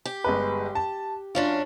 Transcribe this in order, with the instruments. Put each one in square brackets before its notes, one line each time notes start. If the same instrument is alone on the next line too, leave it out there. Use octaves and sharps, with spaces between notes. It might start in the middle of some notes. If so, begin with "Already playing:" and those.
[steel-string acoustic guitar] G4
[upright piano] G1 G#3 B4
A5
[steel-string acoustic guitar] F#2 C#4 D4 [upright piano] F4